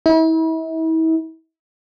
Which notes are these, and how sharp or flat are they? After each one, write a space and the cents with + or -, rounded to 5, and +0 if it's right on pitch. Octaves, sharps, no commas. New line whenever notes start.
E4 -40